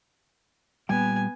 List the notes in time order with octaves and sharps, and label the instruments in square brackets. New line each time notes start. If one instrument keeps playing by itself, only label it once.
[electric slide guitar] A#2 G3 G5 [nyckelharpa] B3 G#5